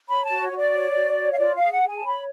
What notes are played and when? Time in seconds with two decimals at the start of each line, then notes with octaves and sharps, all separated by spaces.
0.09 C#5 B5
0.25 A5
0.31 F#4
0.41 C#5
0.52 F#4
0.57 D5
0.73 C#5
0.95 F#4
1.17 C#5
1.32 F5
1.39 F4 D5
1.55 F5
1.61 G#4
1.72 F#5
1.83 G#4 G#5
1.96 A5
2.04 C#5 B5